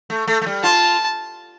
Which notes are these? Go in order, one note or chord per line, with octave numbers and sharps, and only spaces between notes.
A3
A3
A3
G3
F4 A5